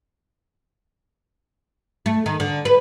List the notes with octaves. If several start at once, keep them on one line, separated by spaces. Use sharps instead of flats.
A3
D#3
D3
B4